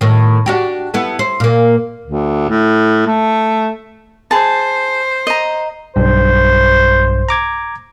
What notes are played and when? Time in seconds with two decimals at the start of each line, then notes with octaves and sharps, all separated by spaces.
0.01 A2 D#3
0.46 D4 F#4 G4
0.94 B3 E4 A4
1.19 C5
1.40 A#2 A#3
2.04 D2
2.49 A2
3.07 A3
4.31 G#4 C5 A5
5.27 D#5 A#5
5.96 B1 G2 C5
7.29 A#5 D6 G#6